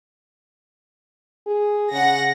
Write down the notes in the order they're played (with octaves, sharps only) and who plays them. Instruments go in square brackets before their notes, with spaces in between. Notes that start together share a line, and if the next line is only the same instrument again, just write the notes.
[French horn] G#4
[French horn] C#3 [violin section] F#5 A#6